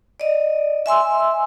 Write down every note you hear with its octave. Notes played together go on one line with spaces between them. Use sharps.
D5 D#5
E5 G#5 C6 E6